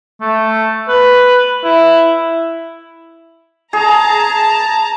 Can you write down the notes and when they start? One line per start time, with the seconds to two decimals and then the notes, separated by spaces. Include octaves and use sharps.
0.21 A3
0.89 B4
1.64 E4
3.73 G#4 A5 A#5